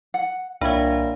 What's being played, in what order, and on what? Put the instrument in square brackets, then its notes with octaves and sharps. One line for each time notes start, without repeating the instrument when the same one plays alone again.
[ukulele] F#5
[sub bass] C2 [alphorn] A#2 [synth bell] D4 F5 [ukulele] C#5 E5 B5